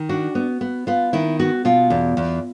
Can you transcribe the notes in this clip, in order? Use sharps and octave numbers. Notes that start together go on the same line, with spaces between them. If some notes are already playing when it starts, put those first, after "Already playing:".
Already playing: D#3
D4 F#4
B3
B3
B3 F4
D#3 E4
B3 F#4
B2 F4
E2
E2